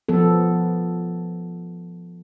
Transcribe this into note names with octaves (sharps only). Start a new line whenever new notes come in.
F3 B3 A4